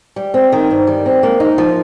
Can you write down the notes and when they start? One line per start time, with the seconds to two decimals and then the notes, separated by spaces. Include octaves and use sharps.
0.16 G3
0.34 C4
0.52 D#3
0.71 G2
0.87 G3
1.06 C4
1.23 A#3
1.40 D#4
1.58 F3